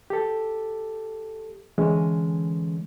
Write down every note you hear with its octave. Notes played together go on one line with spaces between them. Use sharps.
G4 A4
D3 E3 G#3 C#4